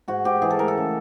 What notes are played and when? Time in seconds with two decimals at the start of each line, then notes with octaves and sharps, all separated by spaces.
0.08 G#2 F#4
0.24 G#2 G4
0.42 E3 G#4
0.50 A4
0.59 A3 A#4
0.68 A4
0.78 C#3